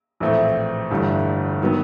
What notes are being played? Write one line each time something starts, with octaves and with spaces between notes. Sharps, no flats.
A#1 A2 E3 A3 C4
G1 G2 E3 A3
D#3 F#3 B3